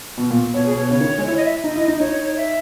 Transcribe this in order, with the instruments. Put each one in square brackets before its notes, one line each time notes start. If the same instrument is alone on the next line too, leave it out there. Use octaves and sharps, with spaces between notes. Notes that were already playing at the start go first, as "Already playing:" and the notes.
[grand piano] B2
A#2
[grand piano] B2 [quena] C#5
[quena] G#4
[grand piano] B2
[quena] C#5
[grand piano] C#3 [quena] C#5
[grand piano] D#3
G#3
[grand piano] E4 [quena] C#5
[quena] D#5
E5
[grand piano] D#4 [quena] D#5
[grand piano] E4
D#4
[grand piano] D#4 [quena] C#5
[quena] E5